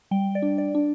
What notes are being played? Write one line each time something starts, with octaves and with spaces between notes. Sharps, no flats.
G3 G5
D5
D4
D5
D4